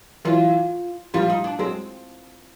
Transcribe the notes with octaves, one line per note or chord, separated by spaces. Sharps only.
E3 F#3 F4
F3 G3 F4
D#4
D4
F#3 G#3 C4